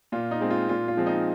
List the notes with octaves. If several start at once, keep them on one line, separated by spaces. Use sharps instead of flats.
A#2 F4
D#4
G#3 C4
F4
A#2 F4
F4
F3 G#3 C4
D#4